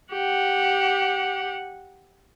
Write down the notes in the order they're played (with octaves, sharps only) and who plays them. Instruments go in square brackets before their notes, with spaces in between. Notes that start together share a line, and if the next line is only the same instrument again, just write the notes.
[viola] G4 F#5